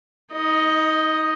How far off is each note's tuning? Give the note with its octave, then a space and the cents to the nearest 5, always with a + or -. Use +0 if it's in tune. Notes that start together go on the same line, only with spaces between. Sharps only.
D#4 +30 D#5 +0